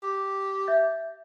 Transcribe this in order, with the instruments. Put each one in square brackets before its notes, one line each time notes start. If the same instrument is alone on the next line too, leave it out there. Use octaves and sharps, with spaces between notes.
[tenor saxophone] G4
[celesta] E5 G6 A6